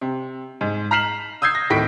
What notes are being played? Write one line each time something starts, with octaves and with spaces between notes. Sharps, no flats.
C3
G#2
A#5 F6 B6 C7 E7 F#7
D#6 E6 G6 G#6 C7
A#6
D1 A2 D#3 B6 D7